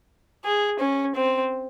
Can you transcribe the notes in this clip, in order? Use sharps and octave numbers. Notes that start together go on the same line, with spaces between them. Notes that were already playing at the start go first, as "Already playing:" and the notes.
G#4
C#4
C4